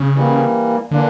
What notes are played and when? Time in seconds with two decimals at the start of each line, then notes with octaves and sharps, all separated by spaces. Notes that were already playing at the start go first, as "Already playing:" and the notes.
Already playing: C#3
0.15 E3 G3 A#3
0.91 D3 E3 A#3 D4